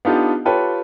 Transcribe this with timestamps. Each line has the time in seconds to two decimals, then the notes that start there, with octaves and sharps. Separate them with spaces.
0.05 B3 D4 D#4 F4 G4 A4
0.45 F4 G4 A4 B4 C#5 G5